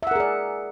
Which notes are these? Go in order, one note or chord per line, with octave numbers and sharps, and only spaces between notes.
G#4 A#4 D5 E5 F#5